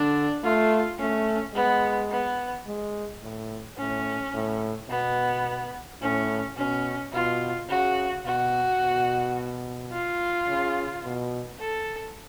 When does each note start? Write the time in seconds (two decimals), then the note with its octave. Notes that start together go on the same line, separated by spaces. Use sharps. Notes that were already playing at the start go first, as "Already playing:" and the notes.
Already playing: D3 D4
0.43 A3 F4
0.99 A3 C#4
1.54 G#3 B3
2.10 B3
2.67 G#3
3.22 A2
3.78 A2 C#4
4.34 A2
4.89 B2 B3
6.01 A2 C#4
6.57 B2 C#4
7.12 B2 F4
7.69 C#3 F#4
8.25 B2 F#4
8.80 B2
9.92 F4
10.48 C#3
11.04 B2
11.59 A4